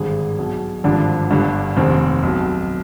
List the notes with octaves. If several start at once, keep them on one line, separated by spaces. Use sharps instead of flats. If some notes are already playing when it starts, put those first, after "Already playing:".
Already playing: G#1 G2 D3 G#4
B1 B2
G#1 G2 D3 F3 D4
G1 G2 D3
F1 D#2 D#3 C4
B1 B2